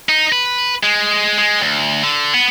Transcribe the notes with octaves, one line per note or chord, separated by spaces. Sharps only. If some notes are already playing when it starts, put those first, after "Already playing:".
D#4
B4
G#3
G#3
D2
D3
B3